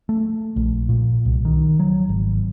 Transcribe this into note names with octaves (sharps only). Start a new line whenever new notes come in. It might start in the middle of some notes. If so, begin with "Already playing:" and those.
A3
A#1
A#2
C2
D#3
F#3
G#1